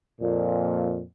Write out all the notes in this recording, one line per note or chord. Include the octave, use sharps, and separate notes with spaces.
F2 A#2